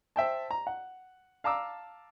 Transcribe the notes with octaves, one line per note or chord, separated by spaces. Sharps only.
C5 E5 G5 A5
A#5
F#5
F5 A5 A#5 D6 E6